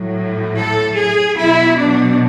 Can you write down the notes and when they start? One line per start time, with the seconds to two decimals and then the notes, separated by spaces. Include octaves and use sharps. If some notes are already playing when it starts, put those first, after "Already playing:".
Already playing: A2 F#3
0.57 A4
0.97 G#4
1.37 B2 F#3 E4
1.77 D4